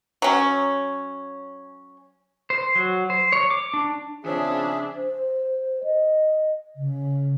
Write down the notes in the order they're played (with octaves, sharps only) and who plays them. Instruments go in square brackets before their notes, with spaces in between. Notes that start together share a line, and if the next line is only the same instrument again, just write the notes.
[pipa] F#3 C#4
[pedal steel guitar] C5
F#3
C5
C#5
D6
D4
[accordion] C#3 G#4 E5 [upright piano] F3 C4 C#5 [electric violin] D4
[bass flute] C5
D#5
C#3